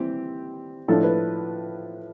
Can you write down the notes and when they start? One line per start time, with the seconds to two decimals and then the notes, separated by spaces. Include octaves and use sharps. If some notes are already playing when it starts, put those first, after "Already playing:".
Already playing: E3 G3 C4 G4
0.88 A2 F3 A3 D4 A4
1.03 B4